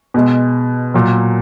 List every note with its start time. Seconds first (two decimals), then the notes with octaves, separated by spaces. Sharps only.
0.14 B2 G#3
0.94 A#2 F#3